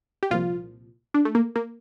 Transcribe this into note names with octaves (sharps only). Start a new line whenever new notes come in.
G4
C2 A#2 F3 F4
D4
A3
A#3
A#3